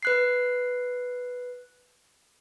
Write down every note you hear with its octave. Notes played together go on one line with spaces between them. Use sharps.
B4 F#6 C7